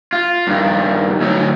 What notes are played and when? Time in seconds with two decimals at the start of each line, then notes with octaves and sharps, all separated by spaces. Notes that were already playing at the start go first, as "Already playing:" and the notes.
0.13 F4
0.47 G2 D#3
1.20 D2 F#3